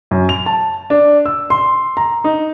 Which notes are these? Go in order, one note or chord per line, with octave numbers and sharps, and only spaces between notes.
F#2
F7
A5
D4
E6
C6
A#5
D#4